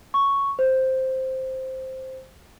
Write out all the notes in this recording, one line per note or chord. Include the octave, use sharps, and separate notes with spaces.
C#6
C5